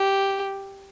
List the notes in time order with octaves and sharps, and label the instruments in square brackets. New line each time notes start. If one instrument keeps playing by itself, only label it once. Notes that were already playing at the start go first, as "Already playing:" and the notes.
Already playing: [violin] G4